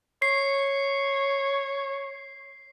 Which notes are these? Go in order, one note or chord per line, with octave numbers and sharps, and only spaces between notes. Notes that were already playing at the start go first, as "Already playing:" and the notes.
C#5 C7